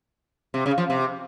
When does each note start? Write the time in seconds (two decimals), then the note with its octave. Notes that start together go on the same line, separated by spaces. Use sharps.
0.54 C3
0.66 C#3
0.78 F3
0.90 C3